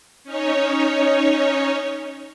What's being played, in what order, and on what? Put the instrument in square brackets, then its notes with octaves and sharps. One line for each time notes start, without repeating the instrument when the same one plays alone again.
[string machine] C#4 D#4 C#5